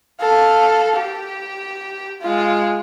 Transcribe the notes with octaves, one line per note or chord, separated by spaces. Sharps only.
A4 F5
G4
G#3 F4